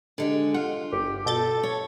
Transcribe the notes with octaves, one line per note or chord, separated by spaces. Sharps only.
D3 G#3 G4
F4 F#5
G1 G4
B2 A4 G6 A6
C#5